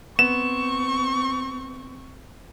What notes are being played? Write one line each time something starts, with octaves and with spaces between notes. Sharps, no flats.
B3 C4 C#6 E7